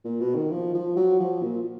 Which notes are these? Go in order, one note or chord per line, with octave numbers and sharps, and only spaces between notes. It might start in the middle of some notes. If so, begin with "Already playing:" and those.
A#2
B2
D#3
F3
F3
F#3
F3
A#2